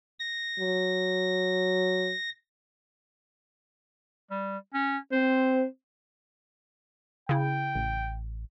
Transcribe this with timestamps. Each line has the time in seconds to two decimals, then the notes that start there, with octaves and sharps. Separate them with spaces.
0.19 A#6
0.60 F#3
4.31 G3
4.74 C#4
5.12 C4 C5
7.29 C#3 E4 G5
7.75 A1